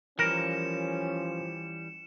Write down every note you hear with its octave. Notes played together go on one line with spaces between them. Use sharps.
E3 F3 G3 C#4 A#4 C#7 E7